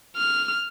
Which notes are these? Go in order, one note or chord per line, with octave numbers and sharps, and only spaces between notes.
F6